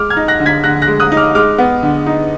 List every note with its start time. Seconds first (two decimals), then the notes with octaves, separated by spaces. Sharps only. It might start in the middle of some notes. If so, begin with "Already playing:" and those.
Already playing: G#3 D6 F6
0.10 F6 G#6
0.16 D#4
0.28 F#6 A#6
0.40 D3
0.46 G#6 B6
0.64 D3 F#6 A#6
0.82 F#6 A#6
0.87 G#3
1.00 D#6 F#6
1.12 D#4
1.17 D6 F6
1.35 G#3 D6 F6
1.58 B3
1.83 D3
2.06 D#4